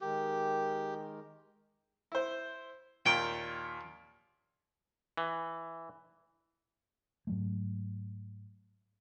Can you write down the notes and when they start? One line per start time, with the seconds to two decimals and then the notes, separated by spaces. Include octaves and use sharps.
0.01 D#3 G#3 G4 A#4
2.12 E4 C5
3.06 D#2 A#2 G5
5.17 E3
7.27 G#2 F#3 A3